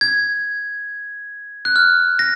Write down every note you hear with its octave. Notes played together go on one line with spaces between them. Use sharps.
G#6
F#6
F6
A#6